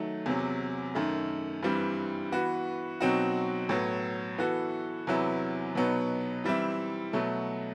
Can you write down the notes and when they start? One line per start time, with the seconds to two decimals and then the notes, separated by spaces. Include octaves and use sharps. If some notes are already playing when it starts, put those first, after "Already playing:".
Already playing: D#3 F#3 A3
0.26 E2 C3 F#3
0.95 F#2 D#3 A3
1.63 G2 E3 G3 C4
2.32 E3 B3 F#4 B4
3.00 B2 F#3 C4 D#4 F#4
3.69 A2 F#3 B3
4.38 E3 B3 F#4 A4
5.07 E2 C3 F#3 B3 E4
5.75 B2 F#3 B3 D#4
6.44 E3 G3 C4 E4
7.13 B2 F#3 A3